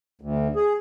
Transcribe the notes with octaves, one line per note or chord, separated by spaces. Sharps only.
D2
G#4